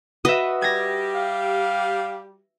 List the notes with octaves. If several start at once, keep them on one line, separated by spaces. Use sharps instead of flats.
F#4 B4 D#5 E5 D#6
G3 G4 G#6 A#6
F5